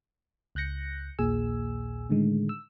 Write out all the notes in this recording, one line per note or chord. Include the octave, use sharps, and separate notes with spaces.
C#2 F#6 G6 A#6 C#7
A#1 D#2 A#2 G#4 G#5 E6
A2 D3 D#3 G#3
E6